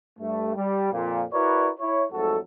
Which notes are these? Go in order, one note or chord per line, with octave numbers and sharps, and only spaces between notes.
G2 A3
G3
F2 A#2
E4 F#4 A#4 B4 C#5 D5
E4 C#5
F2 G#2 F#3 A3 F#4 A4